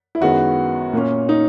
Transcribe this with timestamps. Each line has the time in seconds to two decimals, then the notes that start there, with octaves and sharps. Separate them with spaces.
0.15 E4
0.20 F#2 D#3 G#3 B3 F#4
0.93 A#2 A#3 C#4
1.29 D#4